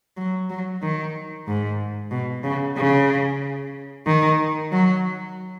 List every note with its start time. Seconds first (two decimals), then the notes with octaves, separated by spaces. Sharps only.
0.17 F#3
0.50 F#3
0.82 D#3
1.47 G#2
2.11 B2
2.44 C#3
2.77 C#3
4.06 D#3
4.72 F#3